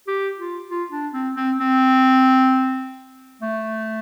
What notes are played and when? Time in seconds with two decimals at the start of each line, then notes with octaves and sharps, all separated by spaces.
0.07 G4
0.38 F4
0.69 F4
0.92 D4
1.13 C4
1.36 C4
1.60 C4
3.42 A3